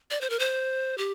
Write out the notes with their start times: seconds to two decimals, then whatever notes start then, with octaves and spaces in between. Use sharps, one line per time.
0.11 D5
0.21 C5
0.30 A#4
0.39 C5
0.98 G4